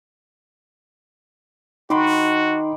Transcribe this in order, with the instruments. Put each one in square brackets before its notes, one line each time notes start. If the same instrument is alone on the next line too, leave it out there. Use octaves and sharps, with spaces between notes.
[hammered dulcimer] D#3 B5 D6 [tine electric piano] D#4 C6 [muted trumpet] F#4